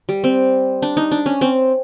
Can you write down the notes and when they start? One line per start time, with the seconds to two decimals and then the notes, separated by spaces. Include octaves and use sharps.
0.09 G3
0.24 C4
0.82 D4
0.97 D#4
1.11 D4
1.26 C#4
1.41 C4